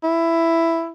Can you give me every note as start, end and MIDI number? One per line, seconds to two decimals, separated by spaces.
0.03 0.92 64